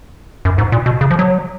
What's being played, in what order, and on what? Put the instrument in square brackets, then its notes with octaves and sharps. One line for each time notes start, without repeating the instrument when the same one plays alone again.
[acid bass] F#2
G#2
A#2
B2
C#3
F3
F#3